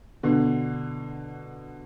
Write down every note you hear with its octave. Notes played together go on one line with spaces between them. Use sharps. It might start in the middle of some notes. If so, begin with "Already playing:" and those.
B2 D3